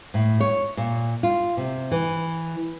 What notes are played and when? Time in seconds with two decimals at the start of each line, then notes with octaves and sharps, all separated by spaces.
0.14 A2
0.40 C#5
0.77 A#2
1.23 F4
1.57 C3
1.91 E3